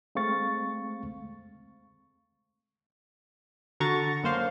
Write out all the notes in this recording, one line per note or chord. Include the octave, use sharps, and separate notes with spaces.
G#3 A3 C4 F5 C#6 A6
D3 F#4 A#5 C#6 A6
F#2 A#3 C5 F5